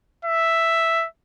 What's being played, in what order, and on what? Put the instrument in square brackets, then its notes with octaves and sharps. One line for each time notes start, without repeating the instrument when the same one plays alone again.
[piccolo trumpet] E5